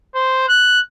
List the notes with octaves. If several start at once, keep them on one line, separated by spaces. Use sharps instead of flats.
C5
F#6